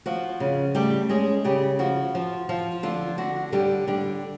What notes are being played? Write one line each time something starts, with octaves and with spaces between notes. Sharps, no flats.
F3 F#4
C#3
G3 A3 G4
G#3 C#4 G#4
C#3 G3 G4
F3 F#4
F3
F3
D3 F4
D3 F#4
D3 G3 G4
D3 G3 G4